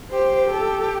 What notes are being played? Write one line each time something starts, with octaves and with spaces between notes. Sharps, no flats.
G4 C5
A4